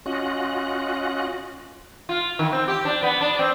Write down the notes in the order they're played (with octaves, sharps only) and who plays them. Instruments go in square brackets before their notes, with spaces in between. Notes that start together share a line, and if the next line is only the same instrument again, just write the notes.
[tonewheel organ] C#4 F4 F#4 D#5 F#6
[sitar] F4
D#3
C4
G4
D4
B3
D4
C4